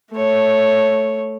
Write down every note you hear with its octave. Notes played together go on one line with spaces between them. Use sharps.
A3 C#5